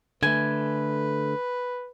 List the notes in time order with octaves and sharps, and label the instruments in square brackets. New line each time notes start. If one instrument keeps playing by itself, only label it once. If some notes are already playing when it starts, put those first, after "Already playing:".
[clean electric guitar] D3 A3 [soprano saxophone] B4 [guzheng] G#5